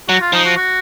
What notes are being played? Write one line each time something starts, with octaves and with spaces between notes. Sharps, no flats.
F#3 F#4
F4
F3 D#4
F#4
F#4